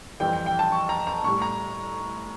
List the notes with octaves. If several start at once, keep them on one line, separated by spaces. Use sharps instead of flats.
F2 E3 G3 G5
G5
G5
A5
C#6
A#5
A#5
A2 G3 C#6
A#5